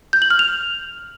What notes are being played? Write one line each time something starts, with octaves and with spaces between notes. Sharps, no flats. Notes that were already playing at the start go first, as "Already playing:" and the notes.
G6
F#7
F6
F7